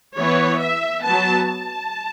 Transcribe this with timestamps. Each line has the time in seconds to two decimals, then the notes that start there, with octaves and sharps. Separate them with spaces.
0.18 E3 B3 C#5
0.61 E5
1.04 F#3 B3 A5
1.47 A5